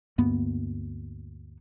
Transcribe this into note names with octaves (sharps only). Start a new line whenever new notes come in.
D2 G2 A#3 B3